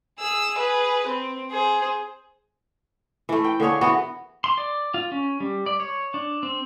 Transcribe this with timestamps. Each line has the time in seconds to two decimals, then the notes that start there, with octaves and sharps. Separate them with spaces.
0.19 G#4 E6
0.57 G#4 B4
1.07 C4
1.51 G#4 C5
3.29 E3 A3
3.44 G5
3.60 D3 A#3 G#4 C#5
3.81 E3 B3 F#4
4.44 C6
4.58 D5
4.94 F4
5.12 C#4
5.40 G3
5.66 D5
5.80 C#5
6.14 D4
6.43 C4